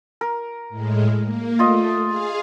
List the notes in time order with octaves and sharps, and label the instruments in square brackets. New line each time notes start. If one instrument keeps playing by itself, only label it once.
[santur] A#4
[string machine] A2 G#3
A#3
[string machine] A3 [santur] F4 D#5
[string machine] G#4 F5